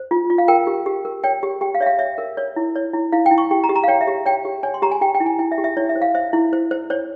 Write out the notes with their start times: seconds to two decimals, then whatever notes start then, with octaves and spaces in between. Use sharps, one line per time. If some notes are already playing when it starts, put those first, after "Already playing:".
Already playing: C5
0.11 F4
0.30 F4
0.38 F5
0.48 A#4 G5
0.67 G4
0.86 G4
1.05 A#4
1.24 C#5 G5
1.43 G4
1.61 G4 G5
1.75 F5
1.81 C#5 E5
1.86 F5
1.99 C#5 E5
2.18 A#4
2.37 C#5
2.56 E4
2.76 C#5
2.94 E4
3.12 E4 F5
3.26 G5
3.31 E4
3.38 C#6
3.51 G4 G5
3.64 A#5
3.69 G4
3.76 A#5
3.84 F5
3.88 C#5 G5
4.01 E5
4.07 G4
4.26 C#5 G5
4.45 G4
4.63 C#5 G#5
4.74 C6
4.82 G4 A#5
4.91 G#5
5.01 G4 G5
5.15 G5
5.20 E4
5.26 G#5
5.39 E4 G5
5.52 E5
5.58 G4
5.64 E5
5.77 E4 C#5
5.89 E5
5.96 C5
6.02 F5
6.15 C5 E5
6.33 E4
6.53 C5
6.71 C5
6.90 C5 C#5